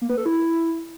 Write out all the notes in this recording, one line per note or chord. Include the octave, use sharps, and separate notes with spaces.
A#3
B4
A4
E4